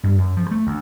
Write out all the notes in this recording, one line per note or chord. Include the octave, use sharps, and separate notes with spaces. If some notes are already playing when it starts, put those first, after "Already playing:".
G2
F#2
F3
A3
D2